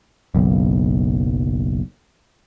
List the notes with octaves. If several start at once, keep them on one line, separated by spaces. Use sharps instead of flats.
F#1 B1